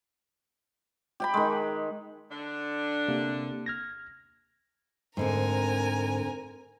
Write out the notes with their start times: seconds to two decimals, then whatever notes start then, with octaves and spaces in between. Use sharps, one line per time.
1.20 G4 G5 B5
1.34 D#3 G#3
2.31 D3 D4
3.08 C3 A#3
3.66 F6 G#6 A#6
5.17 D2 G#2 D3 C4 A#4 G#5